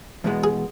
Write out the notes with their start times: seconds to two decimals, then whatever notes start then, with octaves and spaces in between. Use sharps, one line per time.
0.24 E2 B2 G#3 B3
0.44 G#4